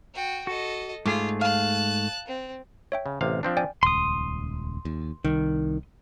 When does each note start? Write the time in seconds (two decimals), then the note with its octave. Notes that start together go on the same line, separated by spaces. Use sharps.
0.14 F#4 G5
0.47 F#4 A4 D#5
1.06 G#2 A3 F4 G#4 D6
1.41 F5 A5 F#6
2.27 C4
2.92 C#5 E5 G5
3.06 C#3
3.21 A1 C3 F5
3.43 F3 C4 D4
3.57 D5 G5 G#5
3.83 D#1 C#2 C6 D#6
4.85 D#2
5.25 C2 D#3